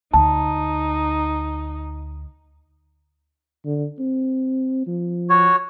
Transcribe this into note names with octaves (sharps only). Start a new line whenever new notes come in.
D2 D#4 A5
D3
C4
F3
F#4 C#5